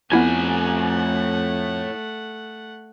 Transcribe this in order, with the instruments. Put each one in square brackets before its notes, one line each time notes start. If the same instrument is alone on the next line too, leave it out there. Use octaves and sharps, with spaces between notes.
[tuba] F2 [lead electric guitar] A2 G#5 [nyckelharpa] A3 F#5 [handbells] B3 E4 G#6